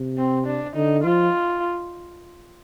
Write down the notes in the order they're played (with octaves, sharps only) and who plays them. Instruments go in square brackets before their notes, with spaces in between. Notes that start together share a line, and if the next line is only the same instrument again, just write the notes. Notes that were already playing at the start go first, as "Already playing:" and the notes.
Already playing: [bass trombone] C3
[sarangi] C4
D4
[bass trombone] D3 [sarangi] D#4
[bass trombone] F3 [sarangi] F4